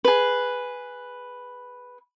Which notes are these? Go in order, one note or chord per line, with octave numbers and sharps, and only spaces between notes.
G#4 B4